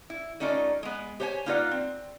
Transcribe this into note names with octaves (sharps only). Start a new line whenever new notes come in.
E4
A3 C#4 D#4 F4 D5
G#3 B3
G4 C5 C#5 E5 G#5
A#3 D#4 F4 B4 D5 F#5
C4